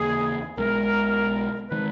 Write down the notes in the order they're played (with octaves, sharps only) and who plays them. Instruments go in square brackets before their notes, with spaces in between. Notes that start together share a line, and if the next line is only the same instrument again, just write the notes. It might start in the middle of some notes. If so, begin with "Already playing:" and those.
Already playing: [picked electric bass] D#2 C#3 E3 A#3 [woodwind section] G#4
[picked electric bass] B1 B2 G#3 [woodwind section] A#4
[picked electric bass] D#3 G#3 [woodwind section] B4